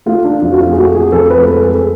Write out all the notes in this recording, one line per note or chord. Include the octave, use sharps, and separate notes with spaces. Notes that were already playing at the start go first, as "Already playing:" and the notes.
A3 F4
D4
F2 F4
F#4
F4
G#4
A3 F#4
G#4
F2 A4
B4
G#3 A4
G#4
A4